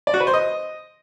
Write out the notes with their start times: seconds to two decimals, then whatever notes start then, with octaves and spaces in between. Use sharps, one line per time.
0.07 D5
0.14 F#4
0.20 B4
0.27 C5
0.34 D#5